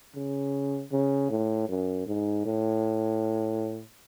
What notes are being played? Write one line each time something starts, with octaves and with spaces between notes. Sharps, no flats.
C#3
C#3
A2
F#2
G#2
A2